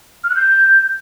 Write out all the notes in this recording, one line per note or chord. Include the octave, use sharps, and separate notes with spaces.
F6
F#6
G6